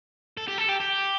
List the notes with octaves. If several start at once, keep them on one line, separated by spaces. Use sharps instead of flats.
A4
G4
A4
G4
G4